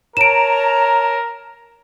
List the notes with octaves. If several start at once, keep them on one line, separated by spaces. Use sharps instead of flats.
A#4 C#5 A5 A#5 D7 E7